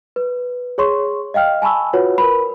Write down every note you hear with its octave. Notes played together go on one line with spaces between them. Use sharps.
B4
G#4 C#5 C6 C#6
D#5 F5 G5 F6
G#5 A5 B5 C#6 E6
F4 F#4 B4 C#5 F#5
A#4 B4 B5